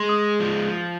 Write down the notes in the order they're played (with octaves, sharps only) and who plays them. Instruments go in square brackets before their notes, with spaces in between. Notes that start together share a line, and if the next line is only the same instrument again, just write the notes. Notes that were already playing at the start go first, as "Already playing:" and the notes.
Already playing: [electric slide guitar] G#3 [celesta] C6
[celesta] D#6
[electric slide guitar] F3